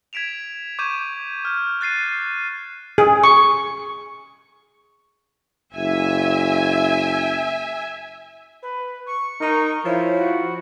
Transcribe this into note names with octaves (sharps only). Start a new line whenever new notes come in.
G#6 B6 D7 E7 F7
C#6 D6 G6 G#6 D#7 E7
F6 G6
F#6 A6 C7 D#7
G#4
C#6
F#1 E5 G#5
B4
C#6
D#4 A#4
F3 E4 C#5
F#4